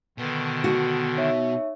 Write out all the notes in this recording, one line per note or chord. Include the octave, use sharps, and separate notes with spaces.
B2 D3 D#3
F#4
D#4 C#5 E5